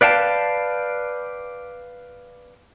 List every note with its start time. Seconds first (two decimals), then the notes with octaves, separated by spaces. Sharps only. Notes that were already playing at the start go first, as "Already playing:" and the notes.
0.01 B4 D5 F5 G5 A5